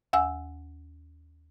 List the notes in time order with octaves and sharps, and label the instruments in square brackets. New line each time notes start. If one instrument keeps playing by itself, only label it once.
[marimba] D#2 F#5 G#5 E6